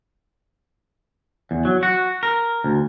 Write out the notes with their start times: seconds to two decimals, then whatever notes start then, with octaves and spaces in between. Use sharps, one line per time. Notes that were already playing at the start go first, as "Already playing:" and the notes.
1.51 E2
1.65 F#3
1.83 F#4
2.23 A#4
2.64 D2